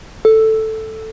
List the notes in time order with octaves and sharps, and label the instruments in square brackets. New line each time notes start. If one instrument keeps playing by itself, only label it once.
[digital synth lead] A4